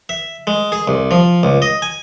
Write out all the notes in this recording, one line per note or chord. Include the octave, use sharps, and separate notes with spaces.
E5
G#3
G#4
C2
F3
C#2
D#5
G#5